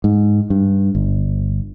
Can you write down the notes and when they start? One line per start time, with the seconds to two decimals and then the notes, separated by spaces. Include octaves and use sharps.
0.04 G#2
0.50 G2
0.95 G1